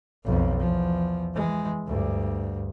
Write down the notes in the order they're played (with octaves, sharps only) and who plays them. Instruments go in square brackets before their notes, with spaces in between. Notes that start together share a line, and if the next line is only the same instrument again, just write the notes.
[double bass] B1 F2
E2 F3
E3 G#3
D2 G2